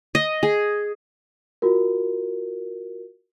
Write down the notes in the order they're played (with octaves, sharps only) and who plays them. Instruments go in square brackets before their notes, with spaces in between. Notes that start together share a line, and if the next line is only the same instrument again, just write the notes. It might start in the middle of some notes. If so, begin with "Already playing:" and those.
[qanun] D#5
G#4
[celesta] F4 F#4 A#4